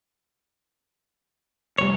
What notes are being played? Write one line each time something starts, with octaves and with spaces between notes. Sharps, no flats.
F1 A#2 G3 C#5